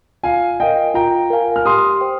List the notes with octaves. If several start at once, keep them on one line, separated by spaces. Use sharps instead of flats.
F4 F5 G#5
A#4 D#5 F5 G5 G#5
F4 G5 A#5
A#4 F5 G#5
F6
G4 C6 D#6
C5 G5